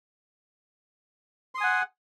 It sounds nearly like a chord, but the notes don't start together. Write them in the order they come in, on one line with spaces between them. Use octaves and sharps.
C6 D#6 G#5 F#5